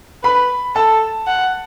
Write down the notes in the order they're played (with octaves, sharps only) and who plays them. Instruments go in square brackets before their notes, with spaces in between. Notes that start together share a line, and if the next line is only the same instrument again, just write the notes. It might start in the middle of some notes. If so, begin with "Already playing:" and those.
[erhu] B4 [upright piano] B5
[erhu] A4 [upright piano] A5
[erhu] F#5